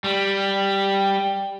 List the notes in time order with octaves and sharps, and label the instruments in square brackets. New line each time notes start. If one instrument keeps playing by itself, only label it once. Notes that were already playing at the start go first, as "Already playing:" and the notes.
[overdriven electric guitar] G3